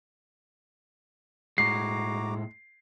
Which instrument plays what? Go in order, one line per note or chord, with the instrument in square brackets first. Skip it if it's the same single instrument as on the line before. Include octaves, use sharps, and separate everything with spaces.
[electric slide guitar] A2 G#3 [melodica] F#4 A#5 D6 [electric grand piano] C7